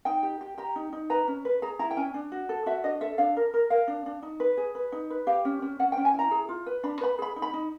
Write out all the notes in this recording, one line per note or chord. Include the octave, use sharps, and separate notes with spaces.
D#4 G5
G4
G4
G4 A#5
D#4
D#4
B4 A#5
C#4
B4
G#4 A#5
E4 A#5
G5
C#4 G#5
D4
F#4
A4
F#4 E5
D4 D#5
A4 E5
D4 F5
A#4
A#4
A#4 F5
D4
D4
D#4
B4
G#4
B4
D#4
B4
G4 F5
C#4
C#4
C#4 F#5
G5
C#4
G#5
E4 A#5
G#4
F4
B4
D4 B5
B4 B5
G#4 B5
D#4
B5
D#4